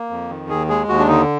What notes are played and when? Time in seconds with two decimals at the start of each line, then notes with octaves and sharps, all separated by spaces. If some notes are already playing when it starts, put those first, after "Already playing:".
Already playing: A#3
0.10 F2
0.29 D#3
0.49 D#2 G#4
0.69 G#3 G#4
0.88 D#2 F#4
0.99 D4
1.08 D3 D#4